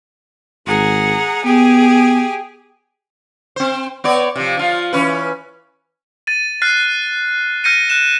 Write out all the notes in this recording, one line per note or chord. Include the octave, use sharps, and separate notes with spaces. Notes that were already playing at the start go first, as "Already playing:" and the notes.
G#1 G#4 F#5 A#5
B3 G4 G#4 G#5
C4 C5
B3 C#5 D5
C3 F3
F3 F4
E3 C#4 B4
A6 D#7
F6 F#6 A6 C7
F6 G6 A#6 C#7 D#7
F#6 E7